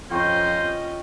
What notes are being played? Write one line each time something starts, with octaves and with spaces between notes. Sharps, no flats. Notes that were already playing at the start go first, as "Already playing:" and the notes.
F2 C#4 F4 C5 D#5 G5 C#6